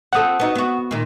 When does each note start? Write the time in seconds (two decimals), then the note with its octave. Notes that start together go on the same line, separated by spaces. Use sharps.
0.13 C4 F4 A4 F#5 D#6
0.40 B3 D#4 F#4
0.55 B3 F#4
0.91 A#2 D#3